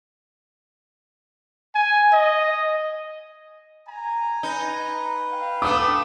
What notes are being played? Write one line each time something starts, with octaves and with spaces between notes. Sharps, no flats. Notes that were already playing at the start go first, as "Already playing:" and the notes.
G#5
D#5
G#5 A#5
D#4 B4
F5 G5
A3 B3 D6 D#6